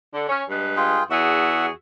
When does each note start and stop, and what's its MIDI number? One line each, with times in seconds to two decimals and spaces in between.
0.14 0.28 50
0.29 0.44 61
0.50 1.00 43
0.50 1.00 56
0.50 1.00 71
0.77 1.03 65
0.77 1.03 68
0.77 1.03 79
1.11 1.71 40
1.11 1.71 66
1.11 1.71 68
1.11 1.66 76
1.11 1.66 78